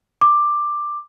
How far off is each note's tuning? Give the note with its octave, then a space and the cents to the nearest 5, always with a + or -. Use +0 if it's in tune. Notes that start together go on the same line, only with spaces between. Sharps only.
D6 +10